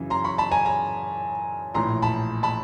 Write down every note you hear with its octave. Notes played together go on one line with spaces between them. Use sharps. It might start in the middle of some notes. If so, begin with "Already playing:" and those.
Already playing: F#2 C#3 E3
A#5 C6
B5 C#6
A5 B5
G#5 A#5
G#5 A#5
A#1 A2 E3 A#5 C6
A5 B5
A5 B5